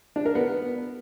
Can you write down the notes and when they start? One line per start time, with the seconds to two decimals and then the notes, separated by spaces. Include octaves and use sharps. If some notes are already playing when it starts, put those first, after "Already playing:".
0.16 D4
0.26 A#4
0.35 B3